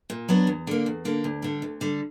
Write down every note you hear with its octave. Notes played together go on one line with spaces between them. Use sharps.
A#2
F#3 B3 D4 F#4
E2
D3 A#3
E2
D3 A#3
D2
D3 G3
D2
D3 G3